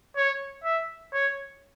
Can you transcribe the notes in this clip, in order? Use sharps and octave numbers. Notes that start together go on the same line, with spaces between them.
C#5
E5
C#5